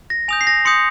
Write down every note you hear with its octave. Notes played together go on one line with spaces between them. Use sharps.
A#6
G#5 D#6 G6 F7
C7
A#6
C6 D#6 G6 C#7